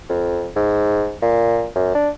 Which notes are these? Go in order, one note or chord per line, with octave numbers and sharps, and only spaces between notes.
F2
G#2
A#2
F#2
D4